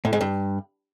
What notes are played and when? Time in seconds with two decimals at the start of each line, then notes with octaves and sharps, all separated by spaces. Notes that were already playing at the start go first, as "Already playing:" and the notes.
0.05 A2
0.13 G#2
0.21 G2